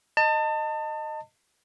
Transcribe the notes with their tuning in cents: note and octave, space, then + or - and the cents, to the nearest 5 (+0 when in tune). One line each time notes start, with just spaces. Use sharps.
D#5 -10 A5 +30